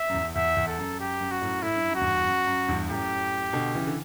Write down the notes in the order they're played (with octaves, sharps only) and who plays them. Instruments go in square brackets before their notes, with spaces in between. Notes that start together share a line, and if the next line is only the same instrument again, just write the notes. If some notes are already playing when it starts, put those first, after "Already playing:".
Already playing: [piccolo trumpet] E5
[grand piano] F#2
E2
[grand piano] E2 [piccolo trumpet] E5
[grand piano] E2
[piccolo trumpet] A4
[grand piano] F#2
[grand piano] F#2 [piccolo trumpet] G4
[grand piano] F#2
[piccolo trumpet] F#4
[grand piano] F#2 A2
[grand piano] A2 [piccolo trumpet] E4
[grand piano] G2
F#2
[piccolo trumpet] F#4
[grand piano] E2 G2
F#2
F#2
E2 G2
[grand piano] F#2 A2 [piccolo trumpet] G4
[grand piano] B2 D3
C#3 E3
D3